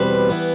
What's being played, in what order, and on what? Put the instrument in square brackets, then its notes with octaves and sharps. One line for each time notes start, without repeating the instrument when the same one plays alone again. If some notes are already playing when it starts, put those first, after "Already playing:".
Already playing: [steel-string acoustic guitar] E2 B2 G3 C4 B4
E3 B3